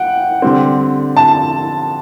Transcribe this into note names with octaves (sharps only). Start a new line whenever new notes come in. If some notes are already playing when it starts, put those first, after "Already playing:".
Already playing: F#5 G5
D3 G3 C4
A5